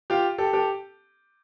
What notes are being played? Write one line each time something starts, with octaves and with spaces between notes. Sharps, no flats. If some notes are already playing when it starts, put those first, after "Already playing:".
F4 G4
G4 A4
G4 A4